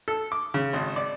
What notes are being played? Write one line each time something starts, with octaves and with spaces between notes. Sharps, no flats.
A4
D6
C#3
G#1
D5